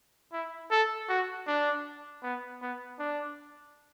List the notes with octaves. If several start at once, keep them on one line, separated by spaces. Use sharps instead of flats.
E4
A4
F#4
D4
B3
B3
D4